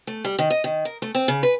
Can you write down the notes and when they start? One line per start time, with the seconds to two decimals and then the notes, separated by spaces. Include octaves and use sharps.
0.07 A3
0.25 G3
0.39 D#3
0.50 D#5
0.64 D#3
0.85 A#4
1.02 A3
1.15 C4
1.28 C#3
1.43 B4